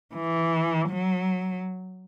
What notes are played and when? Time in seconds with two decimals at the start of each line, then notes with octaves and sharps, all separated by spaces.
0.14 E3
0.89 F#3